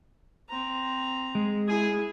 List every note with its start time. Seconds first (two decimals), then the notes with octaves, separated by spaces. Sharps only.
0.49 C4 A#5
1.35 G#3
1.68 E4 G#4